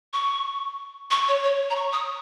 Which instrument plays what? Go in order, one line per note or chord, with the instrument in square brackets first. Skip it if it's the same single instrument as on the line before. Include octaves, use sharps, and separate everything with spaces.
[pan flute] C#6
C#6
C#5
C#5
A#5
C#6
D#6